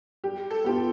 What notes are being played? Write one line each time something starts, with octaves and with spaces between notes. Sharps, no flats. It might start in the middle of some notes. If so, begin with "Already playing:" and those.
G3 G4
A4
B3 F4 G4